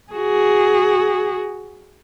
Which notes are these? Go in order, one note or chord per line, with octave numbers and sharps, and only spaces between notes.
F#4 G#4